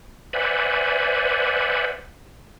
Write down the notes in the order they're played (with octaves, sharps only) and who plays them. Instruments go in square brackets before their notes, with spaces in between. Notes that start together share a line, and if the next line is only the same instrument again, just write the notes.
[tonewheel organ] B4 C5 D5 E5 F#5 G#5